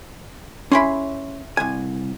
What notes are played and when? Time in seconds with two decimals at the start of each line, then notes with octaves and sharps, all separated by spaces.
0.72 C#4 E4 G#4 B5 C6
1.57 C2 G#5